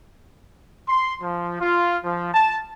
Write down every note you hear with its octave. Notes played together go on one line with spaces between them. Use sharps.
C6
F3
F4
F3
A5